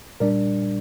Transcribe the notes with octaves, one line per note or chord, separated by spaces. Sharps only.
A#2 G3 D4 A#4 D5